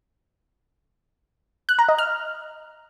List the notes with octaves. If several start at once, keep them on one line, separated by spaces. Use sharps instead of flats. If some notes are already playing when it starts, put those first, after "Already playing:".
F#6
A#5
D#5
F6